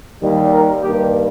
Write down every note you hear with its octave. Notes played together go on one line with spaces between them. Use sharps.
D#2 D#3 G3
A#4
G2 D#3 G3 A#3 G4